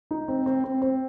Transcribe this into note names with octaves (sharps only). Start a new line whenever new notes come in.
D#4
C4
C4
C4
C4